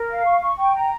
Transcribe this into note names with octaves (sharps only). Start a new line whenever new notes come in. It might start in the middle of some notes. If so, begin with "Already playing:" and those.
Already playing: A#4
F5
C#6
C#6
G5
A#5